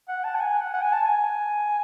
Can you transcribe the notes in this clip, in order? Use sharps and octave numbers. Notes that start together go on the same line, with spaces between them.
F#5
A5
F#5
G#5
F#5
F#5
G#5
A5
G#5